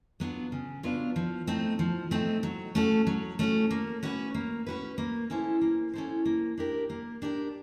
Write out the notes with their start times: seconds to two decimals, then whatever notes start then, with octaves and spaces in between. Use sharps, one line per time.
0.20 F#3 B3 D4 F4
0.52 C#3
0.83 F#3 B3 D4 F4
1.16 F3
1.47 A3 C4 D#4
1.79 F3
2.11 A3 C4 D#4
2.43 F#3
2.75 A3 C#4 F#4 A4
3.07 F#3
3.39 A3 C#4 F#4 A4
3.71 A#3
4.03 C#4 F#4 B4
4.34 A#3
4.67 C#4 F#4 B4
4.98 A#3
5.30 C#4 E4 A4 C5
5.61 A#3
5.93 C#4 E4 A4 C5
6.25 A#3
6.58 D4 G4 A#4
6.90 A#3
7.22 D4 G4 A#4